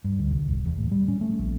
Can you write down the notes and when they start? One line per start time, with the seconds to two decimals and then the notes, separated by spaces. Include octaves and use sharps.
0.04 G2
0.19 D2
0.30 C2
0.48 E1
0.66 E2
0.78 A2
0.91 G3
1.08 C#4
1.21 A3
1.39 A#1